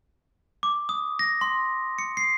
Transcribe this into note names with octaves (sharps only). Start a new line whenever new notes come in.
D6
D#6
A#6
C6
C#7
C7